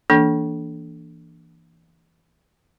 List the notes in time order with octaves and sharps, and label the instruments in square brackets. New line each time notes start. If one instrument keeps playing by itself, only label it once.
[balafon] E3 A#3 D4 A4